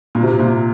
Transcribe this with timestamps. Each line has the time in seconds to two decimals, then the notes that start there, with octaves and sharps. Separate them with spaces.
0.15 A#2
0.23 C3
0.39 A#2